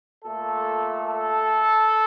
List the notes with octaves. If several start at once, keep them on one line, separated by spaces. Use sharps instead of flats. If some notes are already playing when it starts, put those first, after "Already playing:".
A#2 A3 A4
A4